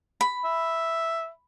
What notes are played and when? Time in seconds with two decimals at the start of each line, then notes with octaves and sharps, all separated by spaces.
0.21 B5
0.45 E5